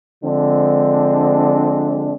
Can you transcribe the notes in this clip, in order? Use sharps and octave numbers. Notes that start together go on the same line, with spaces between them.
D3 F3 G#3 C4 D4